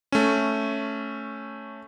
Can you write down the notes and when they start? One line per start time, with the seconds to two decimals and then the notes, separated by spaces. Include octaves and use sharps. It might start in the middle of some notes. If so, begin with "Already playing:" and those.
0.12 A3 C#4